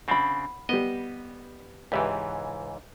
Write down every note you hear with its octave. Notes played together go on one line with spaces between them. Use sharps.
C#3 C4 D4 F#5 B5
G3 B3 D#5
C#2 G#2 E3 G4 B4 E5